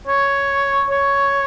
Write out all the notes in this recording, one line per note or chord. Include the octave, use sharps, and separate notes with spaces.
C#5
C#5